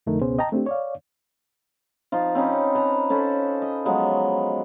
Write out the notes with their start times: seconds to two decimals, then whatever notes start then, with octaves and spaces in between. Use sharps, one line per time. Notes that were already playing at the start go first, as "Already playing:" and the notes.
0.07 F2 D3 A3 D#4 A#4
0.21 C#2 B2 B3 C#4 G#4 C5
0.39 D#5 G5 A5 A#5
0.52 A3 C4 D4 G4
0.66 C#5 D5 F5
2.12 F3 D#4 F4
2.35 C4 C#4 D#4 B4
2.75 B4 A5 A#5
3.10 C#4 A4 B4 C5
3.62 D#5
3.85 F3 F#3 G#3 B3